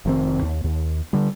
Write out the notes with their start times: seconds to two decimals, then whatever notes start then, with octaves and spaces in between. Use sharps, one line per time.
0.05 F1 D#3 C4
0.42 D#2
0.64 D#2
1.13 D3 G3